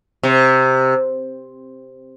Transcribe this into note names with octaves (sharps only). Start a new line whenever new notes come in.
C3